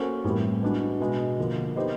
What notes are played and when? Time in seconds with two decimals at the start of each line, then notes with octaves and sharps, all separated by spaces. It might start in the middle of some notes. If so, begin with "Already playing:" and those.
Already playing: A#3 C#4 F#4 A4 C5
0.24 A2 E3 G3 C4
0.63 G#3 B3 D4 F#4
1.00 B2 G#3 B3
1.39 D3 F3 A#3
1.76 B3 D#4 G4 C5 D#5